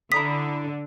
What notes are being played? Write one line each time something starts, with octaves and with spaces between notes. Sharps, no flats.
D3 E4 A#5 D#6 B6